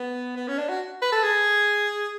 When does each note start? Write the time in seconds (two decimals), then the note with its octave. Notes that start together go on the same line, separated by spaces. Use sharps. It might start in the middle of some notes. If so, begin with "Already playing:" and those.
Already playing: B3
0.36 B3
0.48 C#4
0.58 D4
0.69 F#4
1.02 B4
1.12 A4
1.23 G#4